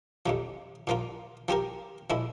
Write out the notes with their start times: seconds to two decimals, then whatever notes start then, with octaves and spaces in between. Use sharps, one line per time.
0.26 F2 C3 F3
0.87 A#2 F3 A#3 F4
1.48 F3 C4 G4 A#4
2.10 A#2 F3 G#3 E4